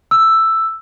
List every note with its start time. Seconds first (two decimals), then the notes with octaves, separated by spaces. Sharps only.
0.11 E6